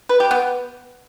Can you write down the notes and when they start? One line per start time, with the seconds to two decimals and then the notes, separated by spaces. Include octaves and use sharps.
0.09 B4
0.20 G4
0.31 B3